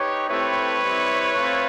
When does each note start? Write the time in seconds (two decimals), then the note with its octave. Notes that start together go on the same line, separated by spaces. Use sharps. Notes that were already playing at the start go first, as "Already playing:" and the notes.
Already playing: D#4 G4 B4 C#5
0.29 A3 C4 E4 G4 B4 C#5
0.81 G3 C4 E4
1.31 A3 C4 F4